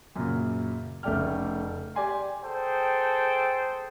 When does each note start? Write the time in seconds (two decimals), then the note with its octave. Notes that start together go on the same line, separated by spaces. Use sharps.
0.16 F#2 A#2 C#3
1.03 F1 C#3 A3 D5 G5 F6
1.95 G4 D5 G#5 C6
2.43 G#4 A4 C5 G5